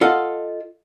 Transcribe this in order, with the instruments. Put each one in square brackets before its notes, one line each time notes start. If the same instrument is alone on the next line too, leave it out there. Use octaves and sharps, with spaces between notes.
[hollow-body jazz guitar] F4 A4 D#5 F#5